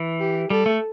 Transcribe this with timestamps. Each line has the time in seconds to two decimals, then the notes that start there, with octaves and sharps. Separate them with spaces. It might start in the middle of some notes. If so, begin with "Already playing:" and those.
Already playing: E3
0.20 G4
0.50 G3 A4
0.66 A3